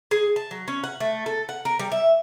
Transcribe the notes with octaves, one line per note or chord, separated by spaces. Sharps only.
G#4
A5
F#3
C#4
F#5
A3
A4
F#5
A#4
G3
E5